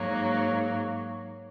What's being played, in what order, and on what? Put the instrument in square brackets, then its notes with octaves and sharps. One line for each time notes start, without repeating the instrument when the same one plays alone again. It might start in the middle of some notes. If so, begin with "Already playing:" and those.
Already playing: [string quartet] G#2 F#3 A#3